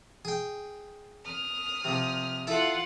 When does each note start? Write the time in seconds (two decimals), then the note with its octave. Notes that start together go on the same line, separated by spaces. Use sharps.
0.25 G#4 G5
1.25 D#6 F6
1.85 C3 F3
2.47 E4 F4 A4 E5 F#5